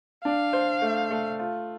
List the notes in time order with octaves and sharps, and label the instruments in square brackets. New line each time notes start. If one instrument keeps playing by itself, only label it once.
[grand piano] D4 [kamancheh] F5
[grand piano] C5
A3
A3
F4